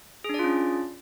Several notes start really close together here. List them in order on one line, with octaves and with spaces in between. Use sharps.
G#4 D4 D5 F4 C#4